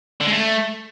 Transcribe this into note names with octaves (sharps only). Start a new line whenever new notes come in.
D3
G#3
A3